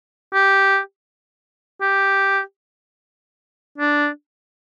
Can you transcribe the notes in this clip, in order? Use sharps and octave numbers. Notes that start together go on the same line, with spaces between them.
G4
G4
D4